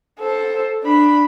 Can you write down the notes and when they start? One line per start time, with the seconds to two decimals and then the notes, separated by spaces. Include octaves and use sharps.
0.19 A4 C5
0.84 D4 B5